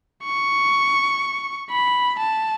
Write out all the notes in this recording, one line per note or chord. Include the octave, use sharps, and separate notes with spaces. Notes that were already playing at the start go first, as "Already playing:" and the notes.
C#6
B5
A5